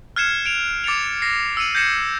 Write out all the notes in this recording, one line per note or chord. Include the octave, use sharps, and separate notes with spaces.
F6 F#6 G#6 C7 C#7 E7
D7 F7
D6 A6 C#7 D7 F7
A#6 C7
E6 C#7 D#7 F#7
G6 G#6 A#6 C7 C#7 E7